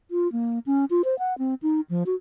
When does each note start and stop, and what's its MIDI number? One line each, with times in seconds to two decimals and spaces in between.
0.11 0.30 65
0.32 0.59 58
0.66 0.85 61
0.90 1.02 65
1.05 1.17 72
1.19 1.37 78
1.38 1.54 60
1.62 1.81 63
1.90 2.03 53
2.06 2.15 66